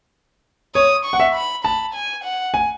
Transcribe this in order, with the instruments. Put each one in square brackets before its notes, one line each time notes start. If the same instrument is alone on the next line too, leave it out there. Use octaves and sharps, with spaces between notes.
[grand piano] C#5 [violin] D#6
[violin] C#6
[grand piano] F#5
E5
[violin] B5
[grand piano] A5 [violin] B5
[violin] G#5
F#5
[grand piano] G#5